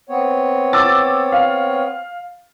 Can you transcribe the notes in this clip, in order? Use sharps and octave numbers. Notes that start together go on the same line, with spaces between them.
B3 C4 C#5
D6 E6 A6
F5